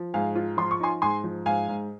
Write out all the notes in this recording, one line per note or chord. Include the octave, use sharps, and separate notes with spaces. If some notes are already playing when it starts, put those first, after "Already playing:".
Already playing: F3
G#2 F5 G#5
F4
F3 C6
C#6
D#4 G#5 C6
G#2 G#5 C6
F3
G#2 F5 G#5
G#2